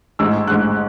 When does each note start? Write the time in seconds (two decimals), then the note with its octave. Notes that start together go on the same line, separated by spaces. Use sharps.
0.19 A1 G#2 G#3 E6
0.47 A1 G#2 G#3 F#6